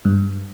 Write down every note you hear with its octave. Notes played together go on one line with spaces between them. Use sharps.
G2